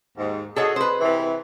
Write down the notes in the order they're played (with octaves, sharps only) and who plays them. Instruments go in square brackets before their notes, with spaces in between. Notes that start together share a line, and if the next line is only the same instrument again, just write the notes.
[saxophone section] D#2 G#2
[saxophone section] F#4 G#4 [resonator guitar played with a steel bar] A4 C#5 D#5
[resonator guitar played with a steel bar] B4 C5
[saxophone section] C3 E3